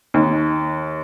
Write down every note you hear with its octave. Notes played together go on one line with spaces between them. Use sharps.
D#2